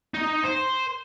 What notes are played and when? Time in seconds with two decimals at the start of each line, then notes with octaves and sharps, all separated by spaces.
0.15 D#4
0.44 C5